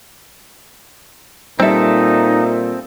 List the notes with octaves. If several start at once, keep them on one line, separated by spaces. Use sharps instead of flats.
A#2 G3 C4 D#4 A4 E5